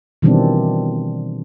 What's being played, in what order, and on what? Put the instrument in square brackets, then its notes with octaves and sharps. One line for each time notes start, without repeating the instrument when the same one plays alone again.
[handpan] B2 D#3 E3 G3 C4 D4